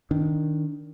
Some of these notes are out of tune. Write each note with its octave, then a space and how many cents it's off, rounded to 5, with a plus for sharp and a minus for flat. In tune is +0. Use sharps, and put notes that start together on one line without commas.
D#3 +0 D4 -15